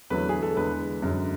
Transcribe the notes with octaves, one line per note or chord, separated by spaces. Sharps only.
E2 D3 F#3 A3 B4
G#4
A4
E2 D3 G#3 B4
F#2 D3 G#3